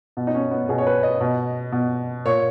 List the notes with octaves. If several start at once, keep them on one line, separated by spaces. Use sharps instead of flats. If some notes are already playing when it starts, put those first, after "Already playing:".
B2
D#4
C#4
B3
B2 G#4
C#5
B4
D#5
B2
B2
A#2 C#5